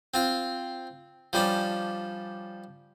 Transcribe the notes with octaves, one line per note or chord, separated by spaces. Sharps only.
C4 F4 F5
F3 G3 C#4 D4